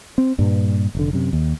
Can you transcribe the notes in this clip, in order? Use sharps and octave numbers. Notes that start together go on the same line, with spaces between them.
C4
G2 A#2
F1 D3
F#2 C3
D#2